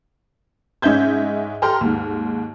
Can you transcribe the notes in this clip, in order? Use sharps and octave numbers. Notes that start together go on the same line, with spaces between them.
G#2 C#4 D#5 E5 G6 G#6
G4 A4 A#5 C6 F6
D#2 G#2